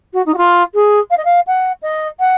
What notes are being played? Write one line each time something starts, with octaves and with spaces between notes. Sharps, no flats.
F#4
D#4
F#4
F4
G#4
F5
D#5
F5
F#5
D#5
F#5